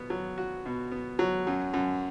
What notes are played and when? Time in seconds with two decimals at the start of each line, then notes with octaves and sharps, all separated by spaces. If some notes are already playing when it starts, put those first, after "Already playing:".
Already playing: B2 B3
0.10 F#3
0.38 F#4
0.66 B2
0.92 B3
1.19 F#3
1.47 F#2
1.74 F#2